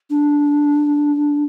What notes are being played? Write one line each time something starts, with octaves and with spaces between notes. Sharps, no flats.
D4